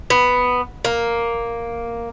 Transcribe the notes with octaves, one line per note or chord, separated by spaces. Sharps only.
B3
A#3